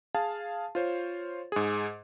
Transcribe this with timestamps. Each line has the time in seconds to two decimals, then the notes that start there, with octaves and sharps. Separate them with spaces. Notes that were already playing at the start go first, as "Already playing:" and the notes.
0.14 G#4 F5 A5
0.75 F4 C5 C#5
1.52 G#2 G#4